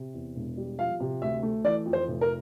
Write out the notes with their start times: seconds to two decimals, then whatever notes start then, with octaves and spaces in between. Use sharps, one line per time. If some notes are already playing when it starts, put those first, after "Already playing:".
Already playing: C3
0.14 E2
0.35 E1
0.57 G3
0.79 F3 F5
1.00 C3
1.22 D2 E5
1.43 A3
1.64 E3 D5
1.86 F2
1.93 C5
2.07 F1
2.21 A#4